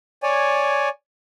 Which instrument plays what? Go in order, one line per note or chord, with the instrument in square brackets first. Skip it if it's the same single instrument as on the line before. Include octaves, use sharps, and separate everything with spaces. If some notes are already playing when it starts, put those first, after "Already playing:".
[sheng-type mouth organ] C#5 D5 G#5